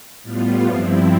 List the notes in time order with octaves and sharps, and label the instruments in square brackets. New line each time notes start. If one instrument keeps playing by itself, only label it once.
[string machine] A2 G3 B3 F4
G2 F3 C4 E4